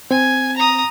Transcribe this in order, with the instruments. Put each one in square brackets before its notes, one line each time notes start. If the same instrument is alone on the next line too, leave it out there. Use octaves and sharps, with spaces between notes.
[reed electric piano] C4 [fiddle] G#5
[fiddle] A#5 D#6